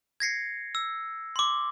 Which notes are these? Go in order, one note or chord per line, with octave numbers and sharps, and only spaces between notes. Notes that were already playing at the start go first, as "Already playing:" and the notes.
G#6 A#6 C7 C#7
E6
C6 D6